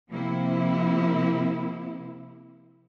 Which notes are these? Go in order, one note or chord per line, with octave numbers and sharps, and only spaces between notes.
C3 F3 A#3 C4 E4